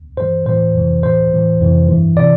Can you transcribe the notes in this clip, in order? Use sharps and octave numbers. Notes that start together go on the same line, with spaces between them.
G2 E3 C5
A2 E3 C5
F2 C3 E3
A2 E3 C5
A2 E3
F2 C3 E3
G2 E3
C3 E3 D5